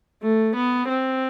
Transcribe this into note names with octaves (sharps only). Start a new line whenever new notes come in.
A3
B3
C4